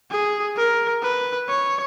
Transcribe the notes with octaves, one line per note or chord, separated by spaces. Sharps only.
G#4
A#4
B4
C#5